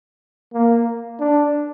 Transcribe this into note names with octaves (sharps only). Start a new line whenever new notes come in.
A#3
D4